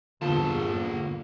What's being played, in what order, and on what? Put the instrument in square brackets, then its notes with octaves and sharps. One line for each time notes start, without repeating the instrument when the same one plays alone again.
[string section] E2 G2 A#2 [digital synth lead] D3 [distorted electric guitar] A#3 A5 [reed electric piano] B3 F4